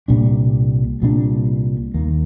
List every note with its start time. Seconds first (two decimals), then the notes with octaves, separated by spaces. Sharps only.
0.08 C2 A#2 G3 D4
1.02 C2 A#2 G3 D4
1.94 D#2 D#3 A#3